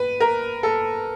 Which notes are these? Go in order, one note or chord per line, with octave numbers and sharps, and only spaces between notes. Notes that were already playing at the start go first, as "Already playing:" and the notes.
Already playing: B4
A#4
A4